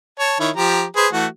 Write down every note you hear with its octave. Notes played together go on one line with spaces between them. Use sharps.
C#5 A5
D#3 E4 C#5
F3 G4 A#5
G#4 B4 C5
E3 A3 F#4